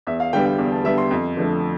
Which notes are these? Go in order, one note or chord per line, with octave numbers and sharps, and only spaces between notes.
E2 E5
F5
D3 G3 B3 G5
G5
E2
A5
D3 G3 B3 E5
C6
F2
D3 F3 A3